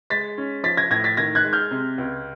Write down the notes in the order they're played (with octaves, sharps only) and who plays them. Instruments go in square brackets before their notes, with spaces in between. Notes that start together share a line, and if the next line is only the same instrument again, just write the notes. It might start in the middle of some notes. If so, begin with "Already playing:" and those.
[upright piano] G#3 A6 B6
C#4
F3 A6 B6
G#6 A#6
A2 G#6 A#6
A6 B6
D#3 G#6 A#6
F#6 G#6
G#3
F6 G6
C3
C#2